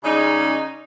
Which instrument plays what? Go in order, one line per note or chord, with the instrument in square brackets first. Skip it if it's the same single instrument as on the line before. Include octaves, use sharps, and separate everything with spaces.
[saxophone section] C#3 G3 G#3 C#4 D#4